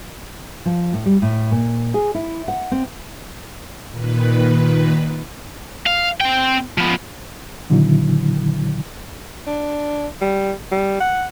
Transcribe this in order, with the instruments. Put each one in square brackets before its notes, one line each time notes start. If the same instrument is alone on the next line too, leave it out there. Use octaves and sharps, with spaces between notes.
[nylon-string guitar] F3
A2
G3
A2
A#2
G#4
E4
F#5
C4
[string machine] A#2 D#3 B4
[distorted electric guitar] F5
C4 G5
F3 B3
[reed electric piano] A#2 D3 D#3 F#3 E4
[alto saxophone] D4
G3
G3
F#5